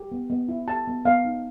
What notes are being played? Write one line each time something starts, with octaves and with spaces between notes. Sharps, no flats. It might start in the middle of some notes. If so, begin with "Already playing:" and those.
Already playing: G4
B3
B3
E4
G4 A5
B3
B3 F5
D#4